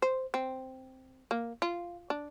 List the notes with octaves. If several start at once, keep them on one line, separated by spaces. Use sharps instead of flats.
C5
C4
A#3
F4
D4